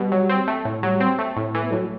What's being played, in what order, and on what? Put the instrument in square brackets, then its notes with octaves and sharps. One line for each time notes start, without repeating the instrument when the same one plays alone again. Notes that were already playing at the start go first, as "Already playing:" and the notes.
Already playing: [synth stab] B2 [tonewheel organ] G3
[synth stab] F#3
C4
A3
A2
[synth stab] F#3 [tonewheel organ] G3
[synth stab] C4
A3
A2
[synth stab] E3 [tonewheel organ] A3
[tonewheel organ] B3
[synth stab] A2 [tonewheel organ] F#3 A3